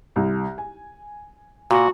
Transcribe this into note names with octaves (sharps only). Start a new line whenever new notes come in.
C2
G#5
A#2 F#4